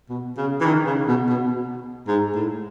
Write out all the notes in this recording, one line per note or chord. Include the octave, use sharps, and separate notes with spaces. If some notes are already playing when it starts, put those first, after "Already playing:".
B2
C#3
E3
D#3
C#3
B2
B2
G#2
A2